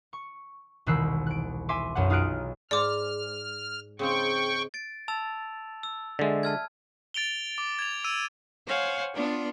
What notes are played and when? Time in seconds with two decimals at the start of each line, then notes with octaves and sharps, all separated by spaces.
0.13 C#6
0.86 E1 C2 D#3 E6 F#6 C7
1.27 F#6 D7
1.69 E5 G#5 C6 D6
1.95 B1 F#2 F#4 F#5
2.10 D#4 F4 G#4 F6 F#6 D7
2.71 G#2 D5 D6 F6
3.99 C#3 C4 D#4 G5 C#6
4.74 A6 D7
5.08 A5 E6 A6 F7
5.83 E6
6.19 D3 G#3 D5 E5
6.43 A5 F6 G#6
7.14 A6 D7 F7 G7
7.58 D6
7.79 G#6 F7
8.04 E6 D#7
8.67 C5 C#5 F5 F#5 G#5
9.15 B3 D4 F4